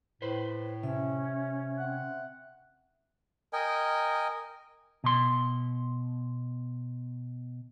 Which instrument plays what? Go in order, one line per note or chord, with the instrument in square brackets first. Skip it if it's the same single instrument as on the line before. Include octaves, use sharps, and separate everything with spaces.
[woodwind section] A2 [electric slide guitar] B4 C5
[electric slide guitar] C3 [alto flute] C#4 [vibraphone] E5
[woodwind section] C4 F#5
[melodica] A#4 D#5 G5 G#5
[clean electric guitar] B2 C6